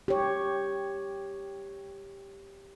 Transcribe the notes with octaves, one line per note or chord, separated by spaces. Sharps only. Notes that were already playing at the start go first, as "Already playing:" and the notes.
G4 C#5